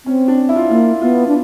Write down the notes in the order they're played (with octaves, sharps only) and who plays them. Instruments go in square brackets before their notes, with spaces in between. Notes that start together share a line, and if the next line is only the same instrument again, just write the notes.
[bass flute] C4 [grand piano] C#4
[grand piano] D4
E4
F4
E4
[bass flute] A#3 [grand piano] F4
[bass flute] B3 [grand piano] F4
[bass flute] D4